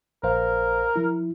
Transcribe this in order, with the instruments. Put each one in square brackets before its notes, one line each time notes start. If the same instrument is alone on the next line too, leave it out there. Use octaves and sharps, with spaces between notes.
[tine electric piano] A#1 C5 F5 [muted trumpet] A#4
[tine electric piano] F3 E4